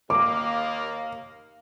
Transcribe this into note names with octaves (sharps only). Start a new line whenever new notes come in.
D#2 A#3 D6